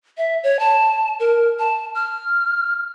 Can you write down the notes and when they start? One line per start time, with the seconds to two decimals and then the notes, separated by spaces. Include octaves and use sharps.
0.18 E5
0.43 C#5
0.59 A5
1.20 A#4
1.59 A5
1.95 F6